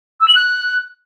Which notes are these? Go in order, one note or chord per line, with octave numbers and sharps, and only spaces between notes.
E6
F#7
F#6